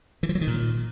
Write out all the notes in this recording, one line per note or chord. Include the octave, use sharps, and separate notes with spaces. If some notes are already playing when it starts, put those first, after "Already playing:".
E3
F3
F#3
D#3
A#2